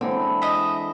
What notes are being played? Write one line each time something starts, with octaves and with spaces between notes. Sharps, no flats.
D3 E3 G#3 C4
D#5 E5